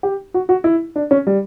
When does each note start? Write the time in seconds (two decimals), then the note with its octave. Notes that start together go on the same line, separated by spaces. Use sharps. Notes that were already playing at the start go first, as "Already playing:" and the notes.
0.03 G4
0.34 F#4
0.49 F#4
0.64 E4
0.96 D4
1.11 C#4
1.27 G3